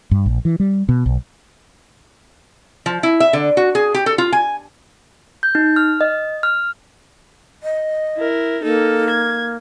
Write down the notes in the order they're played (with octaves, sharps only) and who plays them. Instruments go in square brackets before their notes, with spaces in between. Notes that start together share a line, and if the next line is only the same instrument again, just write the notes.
[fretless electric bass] G2
A#1
E3
G3
B2
B1
[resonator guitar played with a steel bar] F3
E4
E5
D3
F#4
G#4
G4
A4
F4
G#5
[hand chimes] G6
D#4
F6
D#5
F6
[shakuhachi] D#5
[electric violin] E4 A#4
[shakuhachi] A#3 [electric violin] D#4 A4
[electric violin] G#6